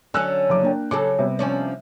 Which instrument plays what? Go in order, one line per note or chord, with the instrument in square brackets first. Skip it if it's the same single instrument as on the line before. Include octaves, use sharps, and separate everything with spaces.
[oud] D3 F#3 C#4 [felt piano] G#5 E6 F#6
[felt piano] F#1 D6
A#3 D4 G5
[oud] C#3 F#3 A4 [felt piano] D6
[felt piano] C3 G3 B3
[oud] F3 C#4 D4